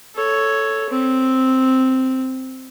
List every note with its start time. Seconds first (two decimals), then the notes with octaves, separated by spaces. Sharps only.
0.15 A4 C#5
0.90 C4